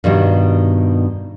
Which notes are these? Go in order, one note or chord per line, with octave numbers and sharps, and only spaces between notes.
G2 B2 D#3 G3